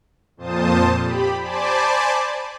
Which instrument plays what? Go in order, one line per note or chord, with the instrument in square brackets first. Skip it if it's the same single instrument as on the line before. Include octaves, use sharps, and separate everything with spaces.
[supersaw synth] F2 A#2 C5 A5 D#6
G4 B5
C5 D5 G#5 A5 B5 D6